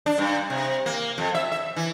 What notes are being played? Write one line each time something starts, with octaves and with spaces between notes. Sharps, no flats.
D4
G2
C3
A#3
F2
E5
E5
E3